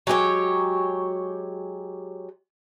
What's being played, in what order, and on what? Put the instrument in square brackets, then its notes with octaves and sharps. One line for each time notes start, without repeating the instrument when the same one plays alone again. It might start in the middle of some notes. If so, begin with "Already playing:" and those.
[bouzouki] F#3 G#3 G4 C#5